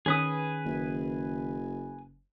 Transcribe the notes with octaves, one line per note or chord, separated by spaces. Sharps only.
D#3 C#4 G#4 B4 D#6
F#1